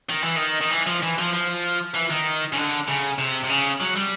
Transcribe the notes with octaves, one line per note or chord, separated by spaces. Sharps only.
D#3
E3
D#3
D#3
E3
F3
E3
F3
F3
E3
D#3
C#3
D3
C#3
C3
C3
C#3
F#3
G3